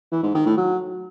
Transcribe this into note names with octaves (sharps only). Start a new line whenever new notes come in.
E3
G#2
D#3
A2
F#3